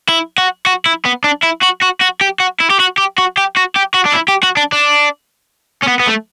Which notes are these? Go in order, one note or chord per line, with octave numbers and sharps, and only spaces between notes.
E4
F#4
F#4
E4
B3
D4
E4
F#4
F#4
F#4
G4
F#4
E4
G4
F#4
G4
F#4
G4
F#4
G4
F#4
D4
E4
G4
F#4
D4
D4
C#4
B3
B3
A3